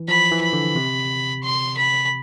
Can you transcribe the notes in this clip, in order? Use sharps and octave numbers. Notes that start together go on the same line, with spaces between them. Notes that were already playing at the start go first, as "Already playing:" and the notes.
Already playing: E3
F3 B5
E3
B5
D3
C3
C6
B5